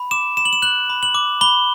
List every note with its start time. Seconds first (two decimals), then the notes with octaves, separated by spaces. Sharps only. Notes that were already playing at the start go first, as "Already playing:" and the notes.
Already playing: B5
0.11 D6 E7
0.37 B5 E7
0.45 F#7
0.53 E7
0.62 F#6 F#7
0.90 B5
1.03 F#7
1.14 D6
1.41 B5 G7